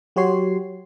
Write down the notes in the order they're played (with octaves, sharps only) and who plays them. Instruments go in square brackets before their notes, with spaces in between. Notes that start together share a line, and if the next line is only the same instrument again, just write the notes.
[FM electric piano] F#3 F#4 G4 C#5 C6 C7